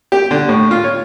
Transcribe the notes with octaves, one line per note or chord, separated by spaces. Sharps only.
G4
D3
A2
F4
C#5